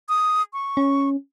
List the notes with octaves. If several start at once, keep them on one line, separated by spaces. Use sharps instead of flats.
D#6
C#6
C#4